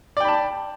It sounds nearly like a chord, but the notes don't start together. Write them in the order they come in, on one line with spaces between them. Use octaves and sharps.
D5 G5 B5 A5